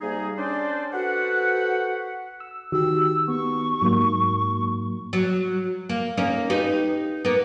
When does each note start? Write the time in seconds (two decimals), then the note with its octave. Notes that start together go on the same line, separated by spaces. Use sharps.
0.01 C3 G3 A#3 D#4 G#4
0.37 C#4 D4 C5 D5
0.93 F#4 A4 B4 C5 F#5
2.40 E6
2.72 D#3 F#4 G4 E6
3.28 B3 C#6
3.82 G#2 F#3 A#3
5.13 F#3
5.89 A#3
6.17 A#3 C#4 D#4
6.50 D#4 G4 B4
7.25 A#3 B3